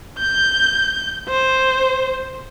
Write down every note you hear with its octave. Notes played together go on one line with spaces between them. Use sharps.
G6
C5